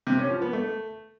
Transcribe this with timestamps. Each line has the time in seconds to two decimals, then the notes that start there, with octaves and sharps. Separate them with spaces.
0.07 C3
0.18 C#4
0.30 F3
0.42 B3
0.53 A3